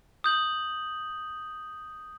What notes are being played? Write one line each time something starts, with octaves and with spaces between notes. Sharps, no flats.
D#6 G6 F#7